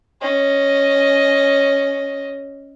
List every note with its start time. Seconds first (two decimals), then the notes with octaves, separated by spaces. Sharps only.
0.21 C#4 D#5